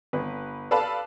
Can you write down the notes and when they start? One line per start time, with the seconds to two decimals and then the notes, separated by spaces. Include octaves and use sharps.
0.13 G1 B4
0.71 A4 B4 D5 F5 A5 B5